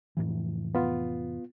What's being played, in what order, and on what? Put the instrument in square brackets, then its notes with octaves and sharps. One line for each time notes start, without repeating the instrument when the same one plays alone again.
[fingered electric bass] F1 A2 E3
[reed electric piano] B3 F4